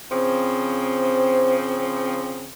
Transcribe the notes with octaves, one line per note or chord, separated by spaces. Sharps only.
C#3 F3 C4